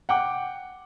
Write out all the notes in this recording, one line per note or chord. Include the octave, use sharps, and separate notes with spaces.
F#5 G5 D6